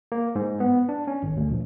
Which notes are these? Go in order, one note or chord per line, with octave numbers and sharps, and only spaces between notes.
A#3
G#2
B3
D4
C#4
G#1
D2
A#1